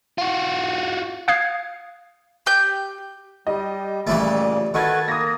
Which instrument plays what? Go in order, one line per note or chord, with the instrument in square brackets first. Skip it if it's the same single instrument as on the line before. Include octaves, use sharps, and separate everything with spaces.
[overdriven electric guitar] F4 F#4
[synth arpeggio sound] F5 D#6 F#6 G#6 C7
[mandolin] G4 G6
[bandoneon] G3 [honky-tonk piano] G4 D#5
[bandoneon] A#2 C#3 [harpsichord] E3 G3 A3
[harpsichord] D#3 [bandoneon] F#4 A4 B4 [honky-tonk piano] C#6 G#6 A6
[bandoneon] A#3 [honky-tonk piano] D#6 A#6